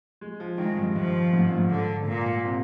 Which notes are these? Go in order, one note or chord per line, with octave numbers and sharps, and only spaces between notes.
G#3
F3
D#3 G#3
F2
G2
G2 F3
G#2
A#2
G#2
D3
A#2
C3